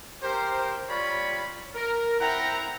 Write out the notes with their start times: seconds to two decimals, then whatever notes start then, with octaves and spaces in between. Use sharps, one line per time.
0.22 G4 A#4 C5
0.89 G3 F4 C#5 D5 B5 C#6
1.75 A#4
2.21 C4 E4 F#5 G5 A#5